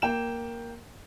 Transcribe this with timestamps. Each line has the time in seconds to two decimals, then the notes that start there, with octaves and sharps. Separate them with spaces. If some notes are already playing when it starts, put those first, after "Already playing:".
0.02 A#3 G5 E7